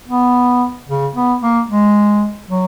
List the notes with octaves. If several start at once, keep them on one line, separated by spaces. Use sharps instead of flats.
B3
C#3
B3
A#3
G#3
F#3